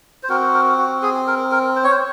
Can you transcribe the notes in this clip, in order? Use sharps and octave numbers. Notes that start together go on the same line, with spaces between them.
C5
C4 F#4 A#4
A#4
F#4
G#4
A#4
A#4
C5
C#5
C5